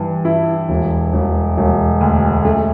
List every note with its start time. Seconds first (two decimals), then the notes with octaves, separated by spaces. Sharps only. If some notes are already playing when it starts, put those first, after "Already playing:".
Already playing: G2 E3
0.25 E4
0.69 E1
1.13 E1
1.57 E1
2.01 D2
2.45 A3